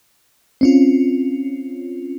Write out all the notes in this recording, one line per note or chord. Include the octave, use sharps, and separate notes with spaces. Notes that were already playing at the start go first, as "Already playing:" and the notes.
C4 C#4 F4